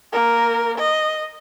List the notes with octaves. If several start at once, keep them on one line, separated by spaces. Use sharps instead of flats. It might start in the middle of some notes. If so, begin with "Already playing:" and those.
A#3 A#4
D#5